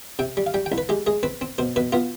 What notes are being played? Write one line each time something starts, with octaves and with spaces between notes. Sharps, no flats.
C3 G5
G3
F5
G3 G5
G5
C2
B4
G#3 G4
G#3 G#4
C4 B4
C4
B2 C5
B2 B4
B3 F4